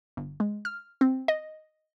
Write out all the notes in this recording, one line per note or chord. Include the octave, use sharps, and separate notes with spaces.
G1
G#3
F6
C4
D#5